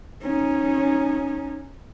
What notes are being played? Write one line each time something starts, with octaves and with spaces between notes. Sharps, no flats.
C#4 D#4